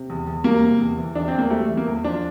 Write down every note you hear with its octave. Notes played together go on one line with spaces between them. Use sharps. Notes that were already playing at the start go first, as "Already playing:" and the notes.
Already playing: C3
E2
E2
G3 A#3
C3
E2
E3
E2 D4
E2 C4
A#3
G3 A3
E3
A#3
E2
F3 D4